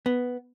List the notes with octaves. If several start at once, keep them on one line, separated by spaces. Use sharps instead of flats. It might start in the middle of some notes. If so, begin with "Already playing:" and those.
B3